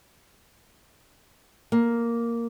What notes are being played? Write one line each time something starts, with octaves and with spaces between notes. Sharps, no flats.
A#3